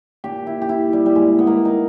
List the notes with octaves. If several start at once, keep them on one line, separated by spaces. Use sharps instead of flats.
A#2 G4
E4
G4
E4
G3
G3
A#2 G#3
B3
A#3
D#4